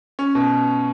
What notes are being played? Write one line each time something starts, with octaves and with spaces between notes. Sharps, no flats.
C#4
B2